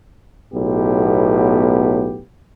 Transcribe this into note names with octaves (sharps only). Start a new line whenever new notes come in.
B1 A2 B3 G4